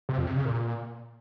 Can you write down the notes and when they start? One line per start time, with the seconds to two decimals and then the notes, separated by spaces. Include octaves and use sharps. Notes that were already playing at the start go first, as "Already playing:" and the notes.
0.09 C3
0.18 F2
0.27 C3
0.36 C#3
0.45 A#2